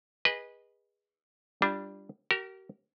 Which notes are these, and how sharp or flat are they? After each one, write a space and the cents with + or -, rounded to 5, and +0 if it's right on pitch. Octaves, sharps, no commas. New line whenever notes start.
G#4 -20 B4 -15 D#5 +0
G3 +0 D4 +0 F4 -35
G4 -45 A#4 -10